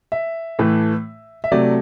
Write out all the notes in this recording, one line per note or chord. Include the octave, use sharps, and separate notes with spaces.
E5
A2 E3 A3
E5
C3 F#3 A3 D5